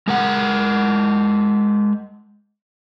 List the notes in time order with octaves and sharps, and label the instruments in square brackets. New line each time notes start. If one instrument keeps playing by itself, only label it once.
[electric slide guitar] G#3 A#4 F#5